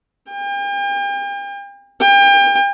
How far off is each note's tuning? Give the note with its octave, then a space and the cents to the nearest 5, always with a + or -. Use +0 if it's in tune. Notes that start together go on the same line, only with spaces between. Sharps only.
G5 +40
G5 +35